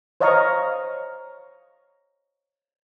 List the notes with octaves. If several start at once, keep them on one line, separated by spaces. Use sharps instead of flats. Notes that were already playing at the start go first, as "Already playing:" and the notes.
C5 C#5 D#5 F5 A#5 C#6